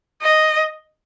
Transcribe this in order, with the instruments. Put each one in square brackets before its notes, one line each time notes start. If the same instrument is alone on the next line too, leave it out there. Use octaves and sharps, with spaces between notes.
[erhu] D#5